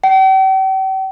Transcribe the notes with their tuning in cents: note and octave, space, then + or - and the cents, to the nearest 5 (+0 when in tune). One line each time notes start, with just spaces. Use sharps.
G5 -40